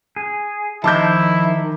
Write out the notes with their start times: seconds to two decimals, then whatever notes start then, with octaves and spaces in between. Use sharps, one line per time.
0.16 G#4
0.84 D#3 F3 E4 C5 D#5 A5 D6 G6